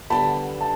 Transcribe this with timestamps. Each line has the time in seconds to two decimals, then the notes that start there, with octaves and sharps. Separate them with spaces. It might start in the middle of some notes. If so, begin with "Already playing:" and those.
0.10 D3 G3 B3 A5 B5
0.61 A5